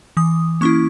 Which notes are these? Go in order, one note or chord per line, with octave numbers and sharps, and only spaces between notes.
E3 D#6
A#3 C#4 E4 C#6